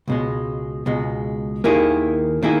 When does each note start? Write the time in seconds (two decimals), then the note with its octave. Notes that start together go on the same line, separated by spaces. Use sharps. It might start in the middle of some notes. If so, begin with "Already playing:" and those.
0.08 C#2 B2 G#3
0.86 C#2 B2 G#3
1.64 D#2 D#3 A#3 E4 G#4
2.43 D#3 A#3 E4 G#4